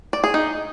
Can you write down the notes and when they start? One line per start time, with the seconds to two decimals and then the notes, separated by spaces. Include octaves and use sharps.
0.13 D5
0.24 G#4
0.34 D#4